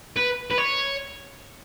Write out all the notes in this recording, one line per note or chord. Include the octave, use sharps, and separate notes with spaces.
B4
B4
C#5